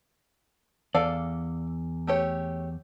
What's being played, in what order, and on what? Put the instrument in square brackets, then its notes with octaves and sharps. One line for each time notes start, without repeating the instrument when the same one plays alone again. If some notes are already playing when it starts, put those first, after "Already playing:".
[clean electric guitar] E2 [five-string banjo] A4 D5 F5
[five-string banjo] A3 G4 C#5